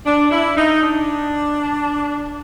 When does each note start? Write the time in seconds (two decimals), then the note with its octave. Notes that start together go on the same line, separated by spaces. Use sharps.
0.06 D4
0.31 E4
0.57 D#4
0.82 D4